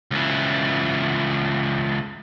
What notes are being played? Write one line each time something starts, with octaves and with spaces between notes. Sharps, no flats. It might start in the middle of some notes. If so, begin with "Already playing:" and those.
C#2 E3